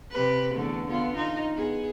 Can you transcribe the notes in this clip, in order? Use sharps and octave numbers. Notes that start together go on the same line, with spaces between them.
C3 G4 B4
E2 D3 A3
D3 B3 F4
D#4 F4
B3 G#4